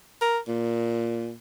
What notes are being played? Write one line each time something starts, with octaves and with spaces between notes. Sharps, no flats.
A#4
A#2